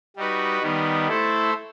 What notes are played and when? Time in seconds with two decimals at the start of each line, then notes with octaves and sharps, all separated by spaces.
0.16 G3 D#4 F#4 B4
0.62 D#3 G3 B3 D#4
1.08 A3 E4 A4 C5